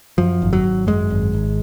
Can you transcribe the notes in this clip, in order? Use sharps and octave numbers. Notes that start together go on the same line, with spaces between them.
F#2 F3
G#1
F#3
G#1
F#2 G#3
G#1
G#1